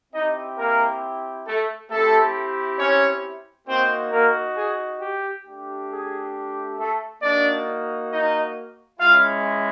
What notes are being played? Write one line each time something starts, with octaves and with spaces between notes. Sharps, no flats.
C4 D#4 E4 G4 D#5
A#3 A#4
A3 A4
A3 C4 E4 G4 A4
C#4 C#5
A#3 C4 D#4 F#4 C5
A#3 A#4
G#4
G4
A3 D4 G4
G#4
A3 A4
A#3 D4 D#4 F#4 D5
D#4 D#5
G#3 C#4 E4 F4 F5